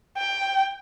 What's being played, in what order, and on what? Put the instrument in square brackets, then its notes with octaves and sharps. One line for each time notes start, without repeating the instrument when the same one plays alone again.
[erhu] G5